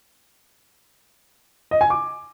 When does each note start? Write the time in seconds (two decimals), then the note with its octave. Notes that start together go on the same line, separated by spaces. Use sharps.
1.71 D#5
1.81 G#5
1.90 D6